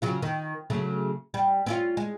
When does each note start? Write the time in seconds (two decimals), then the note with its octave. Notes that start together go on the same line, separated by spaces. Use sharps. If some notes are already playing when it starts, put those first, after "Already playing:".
0.02 C#3 F#3 F4
0.22 D#3
0.70 C#3 F#3 A3
1.34 G3
1.66 C4 C#4 F4
1.97 G#3